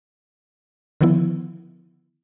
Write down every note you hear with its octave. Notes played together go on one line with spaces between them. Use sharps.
D3 D#3 F3 B3 E4